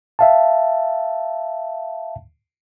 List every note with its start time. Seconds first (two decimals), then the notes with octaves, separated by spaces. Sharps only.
0.19 E5 F5 A5